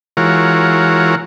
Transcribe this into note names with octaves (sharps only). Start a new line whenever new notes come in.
E3 G#3 F4 F#4 A#4 C#5